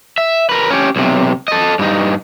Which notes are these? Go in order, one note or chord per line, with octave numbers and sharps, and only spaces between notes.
E5
A#4 B4
C#4 G4
B1 C3
A4 D#5
G2 D#4